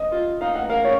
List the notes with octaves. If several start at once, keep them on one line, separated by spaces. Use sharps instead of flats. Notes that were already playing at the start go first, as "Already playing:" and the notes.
Already playing: D#5
F4
D#4 F5
F#5
A#4 F5
C#5